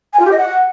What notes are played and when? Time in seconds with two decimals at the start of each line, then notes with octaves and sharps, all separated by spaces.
0.13 G#5
0.19 F4
0.26 G4
0.32 D#5
0.38 F#5